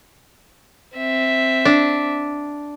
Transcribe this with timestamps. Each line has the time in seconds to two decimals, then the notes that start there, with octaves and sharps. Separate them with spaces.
0.96 C4 E5
1.65 D4